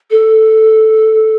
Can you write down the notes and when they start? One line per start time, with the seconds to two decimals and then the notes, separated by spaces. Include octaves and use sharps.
0.11 A4